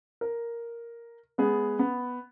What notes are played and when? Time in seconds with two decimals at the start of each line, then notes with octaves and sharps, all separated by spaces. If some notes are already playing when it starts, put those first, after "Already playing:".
0.21 A#4
1.38 G#3 B3 G#4
1.79 B3